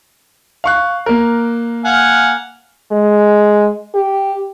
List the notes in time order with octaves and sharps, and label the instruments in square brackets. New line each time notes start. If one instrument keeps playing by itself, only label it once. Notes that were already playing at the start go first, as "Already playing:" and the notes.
[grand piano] F5 C#6 F#6
A#3 A#4
[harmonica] F5 F#5 G#5
[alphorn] G#3
G4